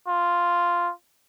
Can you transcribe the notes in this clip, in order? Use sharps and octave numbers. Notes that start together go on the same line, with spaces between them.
F4